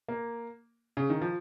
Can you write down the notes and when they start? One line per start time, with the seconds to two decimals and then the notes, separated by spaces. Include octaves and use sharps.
0.08 A#3
0.97 C#3
1.10 D#3
1.21 F3